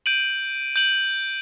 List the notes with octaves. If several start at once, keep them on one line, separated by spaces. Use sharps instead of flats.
G6 D7 D#7 F#7
G6 F#7